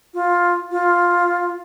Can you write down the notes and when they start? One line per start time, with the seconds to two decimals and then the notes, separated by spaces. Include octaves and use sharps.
0.14 F4
0.71 F4